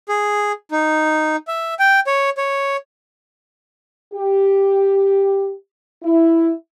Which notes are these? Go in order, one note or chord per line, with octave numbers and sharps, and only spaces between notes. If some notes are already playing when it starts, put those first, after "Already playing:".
G#4
D#4
E5
G5
C#5
C#5
G4
E4